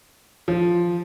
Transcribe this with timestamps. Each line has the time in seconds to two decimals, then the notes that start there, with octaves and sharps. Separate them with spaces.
0.48 F3